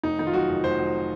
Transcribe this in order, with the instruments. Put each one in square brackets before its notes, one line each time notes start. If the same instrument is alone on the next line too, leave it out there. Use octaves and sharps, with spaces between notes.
[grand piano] F1 D#4
D#3 D#4
F4
F#3 F#4
F1
F1 C5
F#3